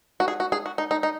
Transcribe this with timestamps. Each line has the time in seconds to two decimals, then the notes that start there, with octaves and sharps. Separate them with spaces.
0.20 F#4
0.28 G#4
0.40 F#4
0.52 G#4
0.66 F#4
0.78 D#4
0.91 D#4
1.03 D#4